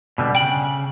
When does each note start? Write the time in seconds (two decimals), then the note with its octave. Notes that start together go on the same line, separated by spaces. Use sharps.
0.18 B2 D3 G3
0.35 C#3 G5 F#7